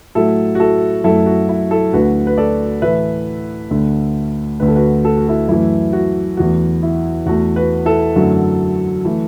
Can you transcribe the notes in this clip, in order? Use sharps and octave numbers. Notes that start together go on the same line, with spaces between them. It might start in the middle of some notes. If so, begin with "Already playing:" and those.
A2 F#3 A3 E4 A4
F#4
E4 A4
F#2 F#3 A3 E4 A4
F#4
E4
E4 A4
D2 D3 A3 F#4 B4
B4
A4 D5
A2 E3 A3 B4 E5
D2 D3 A3
D2 D3 A3 B4
A4
F#4 B4
A4
F#4
E4 A4
F#2 E3 A3 E4
F#4
E2 E3 A3 F#4
E4
E2 E3 A3 F#4
F#4 B4
E4 A4
F#2 D3 F#3 A3
E3 A3